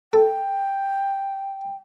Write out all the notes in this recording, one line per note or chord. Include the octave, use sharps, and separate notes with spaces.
A4 G5